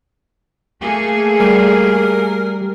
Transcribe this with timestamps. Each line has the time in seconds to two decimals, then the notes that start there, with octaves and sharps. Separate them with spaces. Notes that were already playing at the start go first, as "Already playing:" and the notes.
0.82 A3 A#3 G#4
1.40 G3 A#4